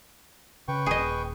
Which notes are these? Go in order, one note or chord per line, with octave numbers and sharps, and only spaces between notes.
C#3 B4 G5 C#6
D#1 G#4 D#5